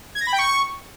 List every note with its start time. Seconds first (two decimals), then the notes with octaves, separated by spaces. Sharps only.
0.15 G#6
0.21 A#6
0.27 B5
0.33 G5
0.38 C#6